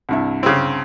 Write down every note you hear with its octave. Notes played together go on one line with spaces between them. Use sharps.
C2 G2 E4
C#3 C4